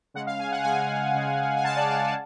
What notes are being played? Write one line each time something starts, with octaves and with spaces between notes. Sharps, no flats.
C#3 G#3 F#5
F5
G#5
F#5
C#3 G#3 G#5
C#3 G#3
G#5
C#3 G#3 A5
D5
F5
D5